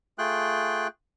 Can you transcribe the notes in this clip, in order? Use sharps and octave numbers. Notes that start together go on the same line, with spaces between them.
A3 F4 G#4 G5 F#6